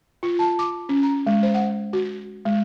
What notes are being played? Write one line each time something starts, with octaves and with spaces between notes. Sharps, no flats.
F4
A5
D6
C#4
A#5
G#3
C5
F#5
F#4
G#3